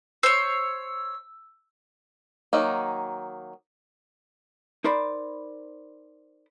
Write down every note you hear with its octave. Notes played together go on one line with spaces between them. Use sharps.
C5 C#5 E6
D#3 F#3 A#3 D#4
D#4 A#4 C5 D5 B5